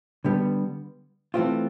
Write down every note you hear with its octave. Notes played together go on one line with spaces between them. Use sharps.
D3 G3 B3
E3 A3 C4 F4